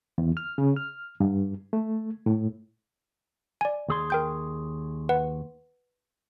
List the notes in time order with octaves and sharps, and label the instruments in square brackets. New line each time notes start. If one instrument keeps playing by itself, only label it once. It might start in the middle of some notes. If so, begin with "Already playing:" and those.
[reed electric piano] E2
F6
C#3
F6
G2
A3
A2
[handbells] D5 G#5
[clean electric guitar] D#2 G#4 C6
[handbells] A#4 G5 G6
B4 F#5